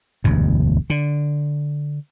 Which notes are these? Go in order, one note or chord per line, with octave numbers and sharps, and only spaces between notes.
E1 D2 G2
D3